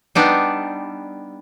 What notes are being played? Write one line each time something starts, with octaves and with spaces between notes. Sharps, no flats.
G3 B3 D4 D#4